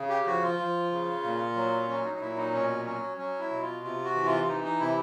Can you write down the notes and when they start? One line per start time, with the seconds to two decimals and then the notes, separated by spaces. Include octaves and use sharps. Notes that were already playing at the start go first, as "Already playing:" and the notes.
Already playing: C#3
0.09 G4
0.26 F3 F#4
0.43 F4
0.59 F3
0.91 C#3
1.23 A#2
1.56 F#3
1.88 F#3 C#4
2.05 D#4
2.15 D#4
2.21 A#2 E4
2.37 D#4
2.53 B2 C#4
2.85 F#3 C#4
3.17 F#3 C#4
3.39 E4
3.51 B2
3.61 F4
3.83 C3 F4
4.04 F#4
4.15 E3
4.26 F4
4.47 E3 D#4
4.64 D#4
4.80 C3 E4